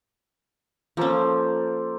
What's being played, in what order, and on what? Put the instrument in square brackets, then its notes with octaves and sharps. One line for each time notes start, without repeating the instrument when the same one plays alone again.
[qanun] F3 C#4 [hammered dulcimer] A#3 A4 C5